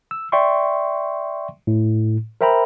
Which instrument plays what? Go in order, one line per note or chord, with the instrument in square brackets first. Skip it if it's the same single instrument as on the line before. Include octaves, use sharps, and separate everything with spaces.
[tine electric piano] E6
D5 E5 G5 C6 C#6
A2
A#4 C5 E5 G5 A#5 B5